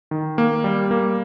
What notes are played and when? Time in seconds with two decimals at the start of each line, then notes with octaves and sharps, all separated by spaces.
0.11 D#3
0.38 A#3
0.64 G3
0.91 A#3